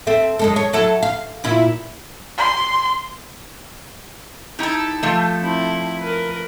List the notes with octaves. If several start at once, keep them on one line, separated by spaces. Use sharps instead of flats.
C4 A4 E5
F#2 G#3 A4
C#5
F#3 E4 A4
F5
A#2 E4 F4
C6
D#4 E4 G4 A4
F3 A3
C4 E4
A#4 B4